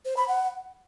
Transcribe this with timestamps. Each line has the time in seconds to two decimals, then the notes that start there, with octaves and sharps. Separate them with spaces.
0.05 C5
0.17 B5
0.28 F#5